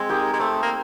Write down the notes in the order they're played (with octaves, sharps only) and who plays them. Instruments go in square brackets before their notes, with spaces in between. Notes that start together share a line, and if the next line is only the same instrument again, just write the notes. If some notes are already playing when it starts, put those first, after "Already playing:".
Already playing: [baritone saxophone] G#3 [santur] C4
[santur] D#4 G4 A#4
[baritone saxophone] G#3
[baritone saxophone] A3 [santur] C4
[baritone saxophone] A#3